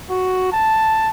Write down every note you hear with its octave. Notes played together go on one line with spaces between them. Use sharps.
F#4
A5